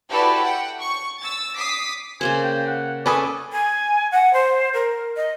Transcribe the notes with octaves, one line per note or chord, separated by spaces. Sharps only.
E4 F#4 G4 A4 B4 D5
F#5 G5
C#6
E6 A6
D6 D#6 B6 C7
C#3 A#3 C5 G#5
G5
F#5
C#4 A4 B4 D5 G#5 D#6
G#5
F#5
C5
A#4
D#5